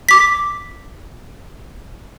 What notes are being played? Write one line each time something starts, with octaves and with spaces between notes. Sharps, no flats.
D6 B6